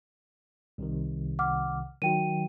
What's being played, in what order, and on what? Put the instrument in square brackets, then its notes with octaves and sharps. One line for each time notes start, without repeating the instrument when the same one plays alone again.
[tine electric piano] C2 C3 D#3
[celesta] F#5 D6 F6
[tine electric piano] D#3 F#3 [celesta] F#4 G5 D#7